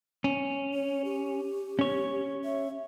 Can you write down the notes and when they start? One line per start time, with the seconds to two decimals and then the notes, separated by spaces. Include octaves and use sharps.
0.24 C#4
0.74 C#5
1.05 G4
1.79 C#4 C#5
2.44 E5